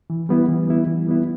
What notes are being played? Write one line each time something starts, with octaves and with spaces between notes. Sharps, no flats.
E3
G3 B3 E4
E3
G3 B3 E4
E3
G3 B3 E4